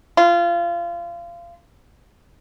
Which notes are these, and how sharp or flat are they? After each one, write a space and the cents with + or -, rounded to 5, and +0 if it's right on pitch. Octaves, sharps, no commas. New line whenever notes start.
F4 -25